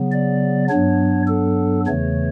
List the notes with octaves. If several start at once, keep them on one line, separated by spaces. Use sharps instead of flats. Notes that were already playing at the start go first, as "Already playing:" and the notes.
Already playing: C#3 F#3 B3
D5
G2 F#3 B3 D4 C#5
A4
E2 C#3 E3 A3 C#5